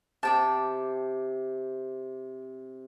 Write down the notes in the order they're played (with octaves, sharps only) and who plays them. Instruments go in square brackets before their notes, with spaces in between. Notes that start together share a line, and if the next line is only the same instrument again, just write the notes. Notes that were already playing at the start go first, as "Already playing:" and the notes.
[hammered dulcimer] C3 [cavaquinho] D5 G5 A5